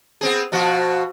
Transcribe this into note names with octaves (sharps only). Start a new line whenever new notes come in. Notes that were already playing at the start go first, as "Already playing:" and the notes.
B3 C4 G#4
B2 F3 F#4